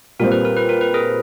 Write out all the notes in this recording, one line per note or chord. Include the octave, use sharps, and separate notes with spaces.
A#2 G3 C4 A#4
B4
A#4
B4
A#4
B4
G#4 A#4